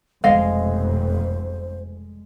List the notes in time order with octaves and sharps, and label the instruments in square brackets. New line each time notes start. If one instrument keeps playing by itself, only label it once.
[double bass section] F1 B1 F2 [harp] G#3 [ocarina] C5 [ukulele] D#5 F5